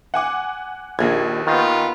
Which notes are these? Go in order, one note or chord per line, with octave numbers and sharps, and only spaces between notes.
F#5 G#5 D6
A#1 D#2 G#6
D#3 B3 F4